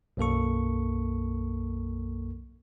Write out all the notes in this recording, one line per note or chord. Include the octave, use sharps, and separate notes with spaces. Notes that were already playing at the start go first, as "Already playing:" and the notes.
B1 F#2 A#3 A4 C#6